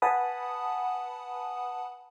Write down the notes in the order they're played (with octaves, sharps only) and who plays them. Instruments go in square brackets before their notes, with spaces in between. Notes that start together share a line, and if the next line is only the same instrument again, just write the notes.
[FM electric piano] B4 F#5 G#5 A5 B5 D#6